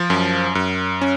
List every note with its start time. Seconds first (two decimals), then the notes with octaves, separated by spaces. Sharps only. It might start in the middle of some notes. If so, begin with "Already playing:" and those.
Already playing: F3 F4
0.10 F#2
0.55 F#2
1.01 C#4